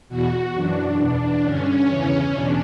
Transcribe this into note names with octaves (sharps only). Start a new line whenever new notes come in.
E2 B2 F#4
F#2 E3 D4
E2 B2 D4
G2 D3 C#4
E2 C#3 E3
E2 B2 D4